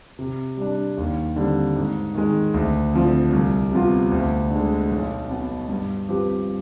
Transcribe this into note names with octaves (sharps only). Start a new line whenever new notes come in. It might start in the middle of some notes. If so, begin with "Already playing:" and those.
C3
G3 D4
D#2
D3 G3 C4
G#2
D#3 G#3
D2
D3 F3 C4
C2
C3 F3 B3 F4
D2
D3
G#3
B1
B2 B3
G2
F3 C4 G4 B4